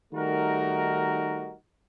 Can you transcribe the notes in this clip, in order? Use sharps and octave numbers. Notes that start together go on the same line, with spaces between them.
D#3 G3 A3 D#4 F#4 A#4